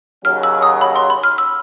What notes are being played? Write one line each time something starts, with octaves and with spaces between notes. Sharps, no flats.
D#2 C#3 F#3 F6
E6
D#6
B5
C6
B5
F6
E6